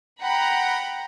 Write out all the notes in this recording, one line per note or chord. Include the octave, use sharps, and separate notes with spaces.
F#5 G5 A#5 B5